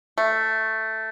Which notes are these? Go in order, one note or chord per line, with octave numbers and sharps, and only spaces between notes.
A3